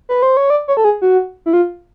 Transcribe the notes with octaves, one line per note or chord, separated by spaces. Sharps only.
B4
C5
C#5
D5
C#5
A4
G#4
F#4
E4
F4